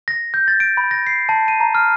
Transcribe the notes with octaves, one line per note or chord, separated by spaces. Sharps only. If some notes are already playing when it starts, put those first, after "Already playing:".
A#6
G6
A6
D7
B5
A#6
C7
A5
D#7
A#5
F6